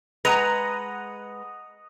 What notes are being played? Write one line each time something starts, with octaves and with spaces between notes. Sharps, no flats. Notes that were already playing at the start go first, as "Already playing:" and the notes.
G#3 B4 D#5 F#5 A#5 D#6